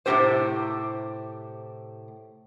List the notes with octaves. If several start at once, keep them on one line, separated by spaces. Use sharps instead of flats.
A2 C3 E3 C4 G4 C5